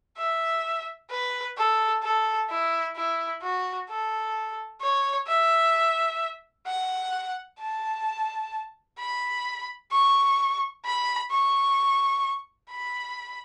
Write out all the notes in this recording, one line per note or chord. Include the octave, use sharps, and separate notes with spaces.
E5
B4
A4
A4
E4
E4
F#4
A4
C#5
E5
F#5
A5
B5
C#6
B5
C#6
B5